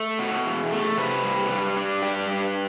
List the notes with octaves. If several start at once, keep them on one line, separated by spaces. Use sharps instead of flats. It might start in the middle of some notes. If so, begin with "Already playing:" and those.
Already playing: A3 A4
B2
E2
A3
C3 B4
G3
G3
D4
G2 G4
G2